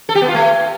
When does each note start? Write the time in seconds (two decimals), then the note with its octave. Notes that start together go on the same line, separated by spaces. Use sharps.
0.09 A4
0.15 G4
0.22 B3
0.28 F4
0.35 A3